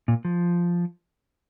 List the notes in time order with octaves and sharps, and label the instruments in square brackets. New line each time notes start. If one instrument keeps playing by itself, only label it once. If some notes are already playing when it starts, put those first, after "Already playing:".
[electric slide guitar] A#2
F3